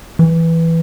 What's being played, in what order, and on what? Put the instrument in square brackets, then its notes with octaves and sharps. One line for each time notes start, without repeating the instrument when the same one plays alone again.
[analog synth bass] E3